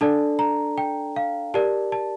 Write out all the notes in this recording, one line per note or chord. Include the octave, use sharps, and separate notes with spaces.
D4 A4 D5 A5
A#5
G5
F5
G4 A#4 D5 A5
A5